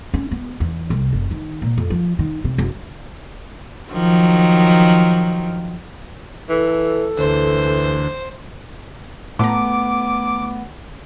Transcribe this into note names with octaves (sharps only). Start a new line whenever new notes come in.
C#4
B3
E2
C2
F#1
D#3
A#2
F2
F3
D#3
C3
F#1
D#3 F3 F#3
E3 A4
D2 E3 C5
A2 A3 B3 A#5 C6 D6